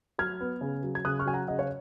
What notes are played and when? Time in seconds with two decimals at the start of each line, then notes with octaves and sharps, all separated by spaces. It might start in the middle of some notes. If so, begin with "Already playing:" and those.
0.18 F#3 F6 G#6
0.40 B3
0.61 C#3
0.83 F#3
0.95 G#6
1.05 C#3 D#6 F#6
1.19 C#6 F6
1.26 F#3 G#5
1.33 F#5 A#5
1.48 C#3 D#5 F#5
1.59 C#5 F5